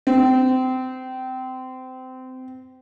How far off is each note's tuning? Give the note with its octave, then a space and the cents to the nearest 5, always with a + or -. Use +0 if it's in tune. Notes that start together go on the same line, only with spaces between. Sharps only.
C4 -25